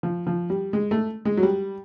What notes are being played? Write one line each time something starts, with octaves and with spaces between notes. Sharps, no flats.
F3
F3
G3
G#3
A3
G#3
F#3
G3